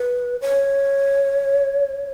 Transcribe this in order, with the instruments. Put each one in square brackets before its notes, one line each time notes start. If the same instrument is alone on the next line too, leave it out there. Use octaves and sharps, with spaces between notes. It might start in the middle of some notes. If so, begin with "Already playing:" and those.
Already playing: [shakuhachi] B4
C#5